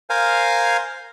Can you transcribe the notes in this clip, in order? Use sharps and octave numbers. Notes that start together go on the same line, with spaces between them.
A#4 C5 F5 G#5